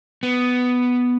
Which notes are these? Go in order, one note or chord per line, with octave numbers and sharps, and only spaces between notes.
B3